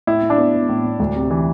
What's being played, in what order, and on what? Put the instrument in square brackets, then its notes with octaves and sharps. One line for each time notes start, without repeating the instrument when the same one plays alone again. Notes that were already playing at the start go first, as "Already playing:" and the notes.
[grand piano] A2 E4
A2
D4
B3
B3
A2
A2
D2
C3
E3